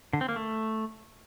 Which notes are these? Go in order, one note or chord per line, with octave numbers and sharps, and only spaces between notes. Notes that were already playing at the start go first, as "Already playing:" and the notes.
D3
C4
A#3
A3